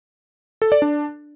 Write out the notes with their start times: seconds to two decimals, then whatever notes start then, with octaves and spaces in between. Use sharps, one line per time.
0.62 A4
0.72 D5
0.82 D4